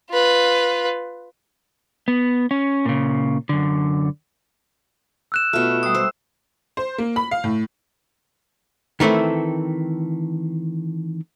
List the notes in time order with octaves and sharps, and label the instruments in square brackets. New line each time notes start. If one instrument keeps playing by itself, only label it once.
[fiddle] F4 B4
[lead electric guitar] B3
C#4
A#2 C#3
F#2 D3
[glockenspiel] E6 F#6 E7
[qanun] B2 A3 [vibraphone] F4
[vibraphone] G3 D#6
[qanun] C5 [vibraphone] E6
[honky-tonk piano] C5
A#3
B5
F5
A2
[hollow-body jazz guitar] D#3 E3 A3 C4 E4